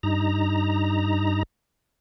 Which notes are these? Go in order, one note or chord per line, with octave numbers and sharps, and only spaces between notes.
G2 D#4 A#5